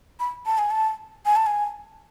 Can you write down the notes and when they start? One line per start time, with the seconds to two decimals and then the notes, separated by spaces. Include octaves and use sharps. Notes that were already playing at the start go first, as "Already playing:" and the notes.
0.20 B5
0.46 A5
0.58 G#5
0.71 A5
1.26 G#5
1.36 A5
1.46 G#5